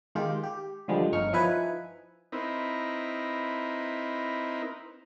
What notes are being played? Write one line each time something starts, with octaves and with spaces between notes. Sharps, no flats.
D#3 G#3 F4 G4
G4
D3 F3 G3 G#3
G1 G2 C#4 D#4 C#6 F6
F3 D#4 E4 B4 G#5
C4 D#4 E4 A#4 B4